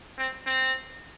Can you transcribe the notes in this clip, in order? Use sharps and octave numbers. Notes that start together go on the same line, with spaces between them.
C4
C4